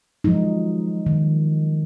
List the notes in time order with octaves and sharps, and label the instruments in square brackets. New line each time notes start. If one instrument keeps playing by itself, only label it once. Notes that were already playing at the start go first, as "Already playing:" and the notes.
[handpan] F3 F#3 G#3 D#4
D#3